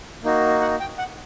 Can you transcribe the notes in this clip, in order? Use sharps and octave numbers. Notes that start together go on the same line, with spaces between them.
A#3 D#4 F#4
F#5
G5
F#5